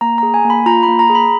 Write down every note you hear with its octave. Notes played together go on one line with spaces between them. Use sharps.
A#3 A#5
G#4 A#5
G#5
A#3
B5
F4 A#5
B5
A#3
A#5
G#4
B5